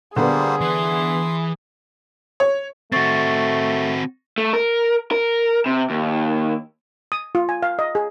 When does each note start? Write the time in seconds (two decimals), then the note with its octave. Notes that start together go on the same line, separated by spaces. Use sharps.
0.16 D3 G3 A#3 B3 G#4 C5
0.61 E3 E5 C6
2.40 C#5
2.92 A3 C4 F#4 C#6 A6
4.38 A3
4.53 A#4
5.11 A#4
5.66 C3
5.90 D#2
7.12 D#6
7.35 F4
7.49 G#5
7.63 F5
7.79 D#5
7.95 G#4